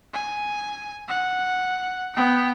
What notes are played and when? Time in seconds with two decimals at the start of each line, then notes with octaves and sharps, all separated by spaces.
0.14 G#5
1.08 F#5
2.14 B3 G5